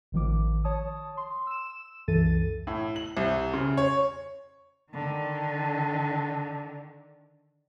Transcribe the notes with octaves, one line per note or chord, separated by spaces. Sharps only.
A1 D#3 F3 D6
C#5 A5 D#6
C6
E6 E7
C2 F#2 E3 A4 A6 D#7
A2
F#7
C2
C#3
C#5
D3 D#3